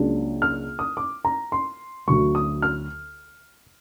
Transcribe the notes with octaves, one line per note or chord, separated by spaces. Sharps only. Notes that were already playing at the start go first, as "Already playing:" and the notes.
Already playing: C#2 C#3 F#3 A#3 D4
F6
D#6
D6
A#5
C6
D2 D3 F#3 C#6
D#6
F6